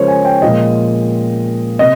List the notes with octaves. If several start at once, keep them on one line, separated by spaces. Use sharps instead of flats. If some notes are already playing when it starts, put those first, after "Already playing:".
Already playing: C#3 F3 G#3 G#4 A#4 C5 C#5
G#5
G5
A#2 F3 G#3 D#5
C3 D#5